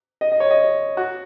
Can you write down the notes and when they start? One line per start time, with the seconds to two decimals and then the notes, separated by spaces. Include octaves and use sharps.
0.21 D#5
0.32 D#5
0.40 C#5
0.51 D#5
0.97 F#4